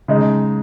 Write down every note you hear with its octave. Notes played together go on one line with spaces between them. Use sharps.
C#3 G#3 D#4